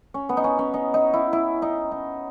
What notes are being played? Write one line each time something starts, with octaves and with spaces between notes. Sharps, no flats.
C#4
B3
D#4
C#4
C#4
D#4
D#4
E4
E4
D#4
D#4